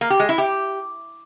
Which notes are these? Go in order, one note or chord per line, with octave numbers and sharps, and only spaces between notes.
A#3
G4
G#3
E4
G4